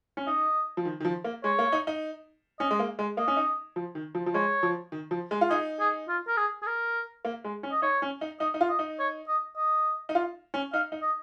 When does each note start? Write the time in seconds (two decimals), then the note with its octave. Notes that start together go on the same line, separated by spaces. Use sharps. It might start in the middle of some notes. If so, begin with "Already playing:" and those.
0.17 C#4
0.27 D#4 D#5
0.77 F3
0.85 D#3
1.00 D#3
1.05 F3
1.24 A#3
1.44 G#3 C#5
1.59 A#3
1.72 D#4
1.87 D#4
2.59 C#4 D#5
2.71 G#3
2.79 A#3
2.99 G#3
3.17 A#3 D#5
3.28 C#4
3.37 D#4
3.76 F3
3.95 D#3
4.15 F3
4.26 F3
4.34 G#3 C#5
4.63 F3
4.92 D#3
5.11 F3
5.31 G#3
5.41 F4
5.50 D#4 G#4
5.80 G#4
6.09 F4
6.28 A#4
6.37 G#4
6.63 G#4
6.67 A#4
7.25 A#3
7.44 G#3
7.63 C#4
7.72 D#5
7.82 D#4 C#5
8.02 C#4
8.21 D#4
8.40 D#4 D#5
8.54 D#4
8.61 F4
8.70 D#5
8.79 D#4
8.99 C#5
9.28 D#5
9.57 D#5
10.09 D#4
10.15 F4
10.54 C#4
10.73 D#4 F5
10.92 D#4
11.02 D#5